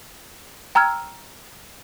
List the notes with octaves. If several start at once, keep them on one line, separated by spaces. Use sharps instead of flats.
G5 A#5 E6 F6 G#6